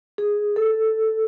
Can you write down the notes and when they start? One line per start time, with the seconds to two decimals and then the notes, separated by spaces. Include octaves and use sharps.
0.18 G#4
0.56 A4